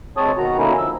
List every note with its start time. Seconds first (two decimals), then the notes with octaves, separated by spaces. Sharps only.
0.17 D2 G#3 C4 C#5 A5 D#6
0.37 B2 D#3 F#4 A#5
0.58 D3 A#3 C#4 D#4 E4
0.78 F3 E6